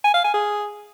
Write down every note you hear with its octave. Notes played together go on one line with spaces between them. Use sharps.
G#5
F5
G#5
G#4